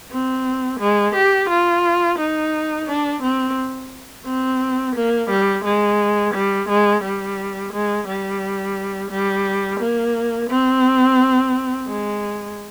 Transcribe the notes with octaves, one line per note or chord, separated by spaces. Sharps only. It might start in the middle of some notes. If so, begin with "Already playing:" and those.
C4
G#3
G4
F4
D#4
D4
C4
C4
A#3
G3
G#3
G3
G#3
G3
G#3
G3
G3
A#3
C4
G#3